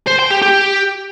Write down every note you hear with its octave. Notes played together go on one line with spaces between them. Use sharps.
C5
G5
G4
G4